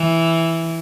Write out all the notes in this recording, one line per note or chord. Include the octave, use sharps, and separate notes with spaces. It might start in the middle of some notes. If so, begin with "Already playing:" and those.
Already playing: E3